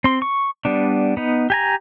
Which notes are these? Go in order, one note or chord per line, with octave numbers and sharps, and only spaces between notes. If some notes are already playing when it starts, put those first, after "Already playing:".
C4 C6
C#6
G3 B3 D4
B3 D#4
G4 G#5 A#5